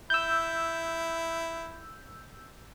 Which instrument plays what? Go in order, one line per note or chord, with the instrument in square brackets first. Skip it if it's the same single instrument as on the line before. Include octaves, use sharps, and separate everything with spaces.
[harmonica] E4 [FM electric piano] E6 G6